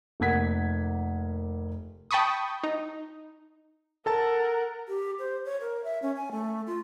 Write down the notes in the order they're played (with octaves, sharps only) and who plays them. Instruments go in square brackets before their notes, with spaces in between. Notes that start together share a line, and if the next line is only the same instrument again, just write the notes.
[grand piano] F1 A#3 F#5 G#6 B6
[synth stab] G5 A5 B5 C#6 D#6
D#4
[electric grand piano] A4 A5 A6 [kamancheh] A#4 F#5
[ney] G4
C5
C#5
A#4
E5
C#4
G#5
A3
F4